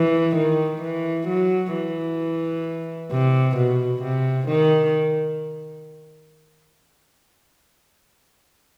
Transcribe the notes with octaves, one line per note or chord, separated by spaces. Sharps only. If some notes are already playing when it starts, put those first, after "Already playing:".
Already playing: E3
D#3
E3
F#3
E3
C3
B2
C3
D#3